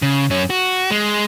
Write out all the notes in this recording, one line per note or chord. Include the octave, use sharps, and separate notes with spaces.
C#3
F#2 C#4
F#4
G#3